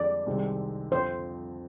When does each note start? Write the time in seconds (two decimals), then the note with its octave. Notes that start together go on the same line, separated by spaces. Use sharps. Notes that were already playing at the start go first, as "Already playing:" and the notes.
Already playing: F2 D3 G#3 D5
0.26 C2 C3 D#3 G#3 C4
0.91 F2 D3 F3 C4 C5